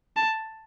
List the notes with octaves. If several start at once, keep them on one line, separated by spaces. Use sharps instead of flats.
A5